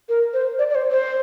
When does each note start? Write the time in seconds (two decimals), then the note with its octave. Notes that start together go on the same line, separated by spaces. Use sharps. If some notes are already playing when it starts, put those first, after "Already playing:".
0.09 A#4
0.34 C5
0.59 D5
0.70 D5
0.75 C5
0.91 C5